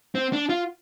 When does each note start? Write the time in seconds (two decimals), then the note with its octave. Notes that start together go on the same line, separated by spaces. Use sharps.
0.15 C4
0.33 D4
0.49 F4